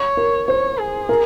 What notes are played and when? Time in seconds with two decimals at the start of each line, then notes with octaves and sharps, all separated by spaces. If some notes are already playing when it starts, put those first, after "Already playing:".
Already playing: C#5
0.17 A#4
0.48 C5 C#5
0.79 G#4
1.09 A#4